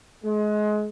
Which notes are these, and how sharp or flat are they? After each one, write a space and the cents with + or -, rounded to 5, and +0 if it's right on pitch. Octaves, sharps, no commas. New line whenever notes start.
G#3 +25